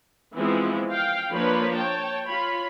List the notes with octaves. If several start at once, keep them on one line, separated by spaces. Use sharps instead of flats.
E3 F3 G#3 B3 C4 E4
F5 G5
F3 A#3 D4 B4 C#5 B5
C#5 G5 A5
F4 C#5 B5